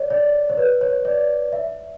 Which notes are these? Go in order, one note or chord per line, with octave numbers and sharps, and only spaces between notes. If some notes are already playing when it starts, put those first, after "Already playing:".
Already playing: C#5 D5
D5
C#5
B4
C#5
D5
E5